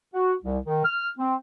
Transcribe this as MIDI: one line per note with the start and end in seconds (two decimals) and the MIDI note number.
0.14 0.34 66
0.43 0.58 36
0.65 0.83 51
0.85 1.09 89
1.18 1.35 60